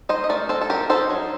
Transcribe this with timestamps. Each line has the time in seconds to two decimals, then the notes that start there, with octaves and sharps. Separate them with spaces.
0.09 D#4 C5 D#5
0.24 D#5
0.29 A3 A#4 D5
0.49 C4 A4 C5
0.61 A4
0.69 F#3 G4 A#4
0.89 D#4 A4 C5
1.10 F#3